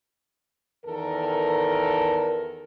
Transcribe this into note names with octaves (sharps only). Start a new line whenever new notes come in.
E2 D#3 A4 A#4